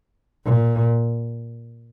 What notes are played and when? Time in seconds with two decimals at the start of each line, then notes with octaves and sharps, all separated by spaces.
0.45 A#2